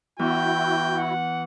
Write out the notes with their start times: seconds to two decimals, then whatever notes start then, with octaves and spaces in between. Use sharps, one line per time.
0.19 E2 E4 F#4 G5
0.95 F#5